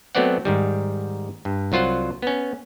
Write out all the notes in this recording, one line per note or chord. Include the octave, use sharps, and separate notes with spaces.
F#3 A3 B3 C4 D5 F#5
G#2 D#3 G3
G2
C2 F#3 F4 C5 F#5
B3 C#4